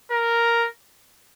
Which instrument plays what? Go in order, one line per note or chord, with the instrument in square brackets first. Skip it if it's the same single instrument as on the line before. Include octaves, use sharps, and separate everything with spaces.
[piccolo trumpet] A#4